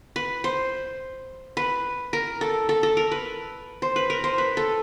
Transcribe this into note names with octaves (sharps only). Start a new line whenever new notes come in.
B4
C5
B4
A#4
A4
A4
A4
A#4
B4
C5
B4
A#4
C5
B4
A4